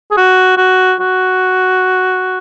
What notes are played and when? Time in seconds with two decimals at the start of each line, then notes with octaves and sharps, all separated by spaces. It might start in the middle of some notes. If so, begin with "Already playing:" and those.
0.11 G#4
0.17 F#4
0.57 F#4
0.99 F#4